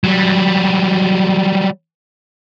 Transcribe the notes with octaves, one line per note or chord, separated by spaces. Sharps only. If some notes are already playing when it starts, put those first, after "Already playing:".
F#3 G3